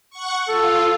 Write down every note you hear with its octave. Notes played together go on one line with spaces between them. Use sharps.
F#5 C#6
F4 A4